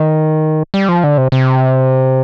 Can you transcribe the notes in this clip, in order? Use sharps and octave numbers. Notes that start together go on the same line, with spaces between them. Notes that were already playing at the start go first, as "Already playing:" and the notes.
Already playing: D#3
G3
F3
D3
C3
C3